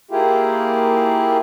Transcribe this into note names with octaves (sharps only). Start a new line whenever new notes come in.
A#3 E4 F4 G4 G#4